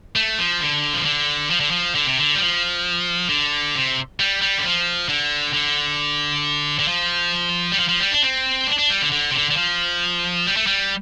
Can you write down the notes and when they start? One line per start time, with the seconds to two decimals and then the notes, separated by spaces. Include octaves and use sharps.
0.16 A3
0.38 F3
0.60 D3
0.94 F3
1.05 D3
1.50 F3
1.60 D3
1.71 F3
1.95 D3
2.07 C3
2.18 D3
2.36 G3
2.40 F3
3.29 D3
3.75 C3
4.20 G3
4.42 G3
4.59 D3
4.64 F3
5.09 D3
5.54 D3
6.80 D3
6.88 F3
7.72 G3
7.78 F3
7.89 F3
8.00 G3
8.11 D4
8.23 C4
8.67 D4
8.79 D4
8.90 G3
9.01 D3
9.12 D3
9.31 C3
9.35 D3
9.51 D3
9.57 F3
10.47 G3
10.57 A3
10.67 G3